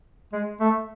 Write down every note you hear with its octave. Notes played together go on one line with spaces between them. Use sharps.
G#3
A3